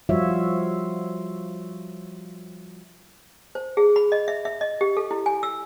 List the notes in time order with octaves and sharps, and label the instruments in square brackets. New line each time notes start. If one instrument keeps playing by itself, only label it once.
[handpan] F3 G3 F4 F#4 C#5 E5
[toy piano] C5
G#4
B5
D#5
E5
E5
D#5
G4
A4
E4
G#5
E6